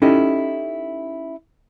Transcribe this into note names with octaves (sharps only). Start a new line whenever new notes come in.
C#4 D#4 E4 G4 A4 D#5